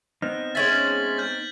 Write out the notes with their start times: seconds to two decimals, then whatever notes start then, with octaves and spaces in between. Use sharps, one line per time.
0.22 B3 C4 D#4 F6
0.55 G#3 C#4 E5 A6 B6 F#7
1.17 F6 G6 A6